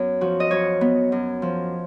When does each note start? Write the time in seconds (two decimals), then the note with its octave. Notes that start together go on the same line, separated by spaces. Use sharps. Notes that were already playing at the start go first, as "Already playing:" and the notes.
Already playing: F#2 B3 C#5
0.21 F3 F#4
0.40 D#5
0.51 F#2 C#5
0.81 B3
1.12 F#2
1.42 F3